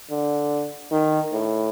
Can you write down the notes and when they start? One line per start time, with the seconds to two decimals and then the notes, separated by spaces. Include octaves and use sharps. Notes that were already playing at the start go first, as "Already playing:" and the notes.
0.10 D3
0.92 D#3
1.33 A2